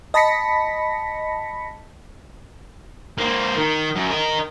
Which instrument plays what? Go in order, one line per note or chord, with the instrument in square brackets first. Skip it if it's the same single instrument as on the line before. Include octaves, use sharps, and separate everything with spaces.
[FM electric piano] D#5 A5 B5 A#6 B6 C#7
[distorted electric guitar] A#3 C4
D#3
F#2
A#4 D#5